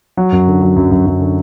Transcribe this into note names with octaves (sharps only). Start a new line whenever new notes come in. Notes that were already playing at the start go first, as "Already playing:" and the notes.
F#3
F#2
D3
F#3
F#2
F#2
F#2
D3